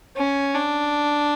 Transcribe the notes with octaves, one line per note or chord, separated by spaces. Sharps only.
C#4
D4